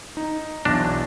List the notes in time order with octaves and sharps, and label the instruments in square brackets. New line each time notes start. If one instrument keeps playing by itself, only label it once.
[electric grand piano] D#4
[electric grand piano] B1 E2 A#6 [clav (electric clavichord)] D4